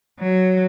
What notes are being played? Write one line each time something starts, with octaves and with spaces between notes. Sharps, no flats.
F#3